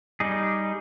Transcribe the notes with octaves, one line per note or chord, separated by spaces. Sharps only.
G3 D#4 G#4